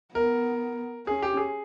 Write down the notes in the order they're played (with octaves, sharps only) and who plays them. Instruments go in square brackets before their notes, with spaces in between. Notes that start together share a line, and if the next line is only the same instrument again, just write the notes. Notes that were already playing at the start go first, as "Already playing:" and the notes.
[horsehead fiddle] B3 [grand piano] A#4
[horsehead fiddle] C#4 [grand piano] G#4
[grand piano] G4
G#4